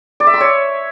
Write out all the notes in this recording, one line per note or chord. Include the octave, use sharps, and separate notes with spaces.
D5
E5
C6
C#5